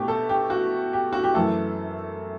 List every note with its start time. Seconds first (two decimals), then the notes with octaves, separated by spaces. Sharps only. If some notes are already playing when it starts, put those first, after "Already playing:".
Already playing: B2 A3 G4
0.08 A4
0.29 G4
0.50 F#4
0.93 G4
1.13 F#4
1.24 G4
1.34 F#2 E3 A3 A4